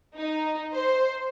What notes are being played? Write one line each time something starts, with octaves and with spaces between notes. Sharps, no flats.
D#4
C5